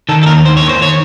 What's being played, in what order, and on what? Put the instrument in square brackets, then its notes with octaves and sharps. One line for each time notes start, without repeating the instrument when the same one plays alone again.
[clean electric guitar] D#3 A4
A4
D#2 A#4
D#2 C5
C#5
D#3
C5
C#5